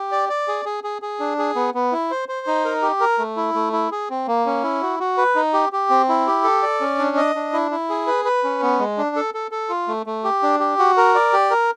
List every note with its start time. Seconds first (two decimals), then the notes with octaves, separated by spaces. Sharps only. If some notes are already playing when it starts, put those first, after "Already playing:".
Already playing: G4
0.12 D5
0.29 D5
0.48 G#4
0.65 G#4
0.84 G#4
1.02 G#4
1.20 D4
1.39 G#4
1.56 B3
1.74 B3
1.92 E4
2.11 C5
2.29 C5
2.47 D#4
2.65 A#4
2.82 G4
3.00 A#4
3.18 A3
3.37 E4
3.54 A3
3.73 E4
3.92 G#4
4.10 C4
4.27 A#3
4.46 C#4
4.64 E4
4.82 F#4
5.00 F#4
5.17 B4
5.36 D#4
5.53 G4
5.73 G4
5.90 C4
6.09 E4
6.27 G4
6.44 A4
6.62 D5
6.81 C#4
6.99 D4
7.17 D#5
7.35 D4
7.53 E4
7.71 E4
7.90 G#4
8.07 B4
8.25 B4
8.44 C#4
8.62 B3
8.79 G#3
8.98 D4
9.16 A4
9.34 A4
9.51 A4
9.69 F4
9.88 A3
10.06 A3
10.24 G4
10.43 D4
10.60 G4
10.79 F#4
10.97 A#4
11.15 D5
11.33 G4
11.50 A#4